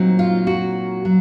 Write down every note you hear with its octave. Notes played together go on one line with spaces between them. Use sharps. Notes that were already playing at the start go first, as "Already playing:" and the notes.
Already playing: A#2 F#3 C4 D#4
F4
F#4
F#3